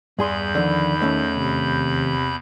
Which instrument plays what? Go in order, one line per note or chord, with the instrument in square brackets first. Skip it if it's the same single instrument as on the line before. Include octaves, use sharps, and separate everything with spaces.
[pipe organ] E2 B5 G6 [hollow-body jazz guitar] G2 G#4 C6
[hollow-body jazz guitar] D3 F3 [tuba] D#3
[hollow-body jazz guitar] D#2 A3 C#4
[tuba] C3